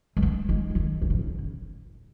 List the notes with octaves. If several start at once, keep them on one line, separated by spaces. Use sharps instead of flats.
G#3
B3
G#3
F#3
D#3
C#3
B2
C#3